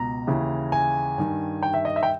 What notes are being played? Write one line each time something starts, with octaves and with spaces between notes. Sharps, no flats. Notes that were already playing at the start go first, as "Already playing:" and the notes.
Already playing: C#2 B2 A#5
D#2 C#3 E3
G#5
G2 D#3
G5
E5
D#5
E5
G5